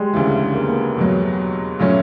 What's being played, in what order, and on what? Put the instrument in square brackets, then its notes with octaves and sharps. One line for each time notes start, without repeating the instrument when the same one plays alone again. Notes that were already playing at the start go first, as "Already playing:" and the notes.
Already playing: [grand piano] G3 G#3
[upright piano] D2 C#3 E3
[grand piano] A#3
B3
A#3
[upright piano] E2 B2 F#3
A#2 F#3 A3 C#4